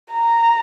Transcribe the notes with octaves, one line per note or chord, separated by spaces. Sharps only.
A#5